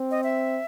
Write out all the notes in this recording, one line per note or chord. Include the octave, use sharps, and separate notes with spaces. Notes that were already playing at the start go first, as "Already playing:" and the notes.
Already playing: C4
D#5
E5